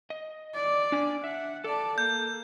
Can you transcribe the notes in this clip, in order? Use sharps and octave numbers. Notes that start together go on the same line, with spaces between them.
D#5
D5
D4 G#5
E5 F#5
A4 D5 A5
A#3 G6